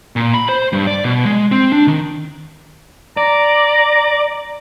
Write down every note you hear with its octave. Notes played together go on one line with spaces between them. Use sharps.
A#2
B5
C5
G2
D5
B2
G#3
C4
D4
D#3
D5 A#5